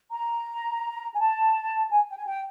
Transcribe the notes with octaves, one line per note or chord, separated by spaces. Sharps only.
A#5
G#5
A5
G#5
G5
G#5
G5